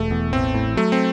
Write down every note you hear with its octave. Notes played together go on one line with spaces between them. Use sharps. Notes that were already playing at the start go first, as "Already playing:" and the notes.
Already playing: E1 A3
E2
A1 C4
A2
F#3 A3
C4